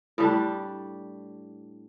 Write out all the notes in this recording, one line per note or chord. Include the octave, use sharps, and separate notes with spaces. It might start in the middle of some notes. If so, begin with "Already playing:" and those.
A2 G3 D4